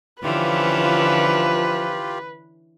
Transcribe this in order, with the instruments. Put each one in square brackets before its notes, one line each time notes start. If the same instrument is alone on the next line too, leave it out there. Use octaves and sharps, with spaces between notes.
[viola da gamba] D3 E3 C#4 [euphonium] F3 [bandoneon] F4 G4 [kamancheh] B4